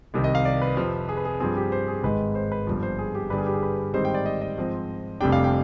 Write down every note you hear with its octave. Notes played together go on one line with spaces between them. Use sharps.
C2 C3 D#3
D#5
F5
D5
B4
F2 C3 F3
G#4
B4
G#4
G2 F3 C4 G#4
G4
C5
G#4
G#1 G#2 D#3 G#3 B4
C5
B4
G1 G2 F3
C5
G#4
G4
G2 D3 G3 D4 B4
G#4
G4
G#4
B4
G#2 D#3 G3 C4 D#4 C5
G5
D5
D#5
D#5
G#2 F3 C4
F1 F2 C3 G3 D4 G5
F5
G5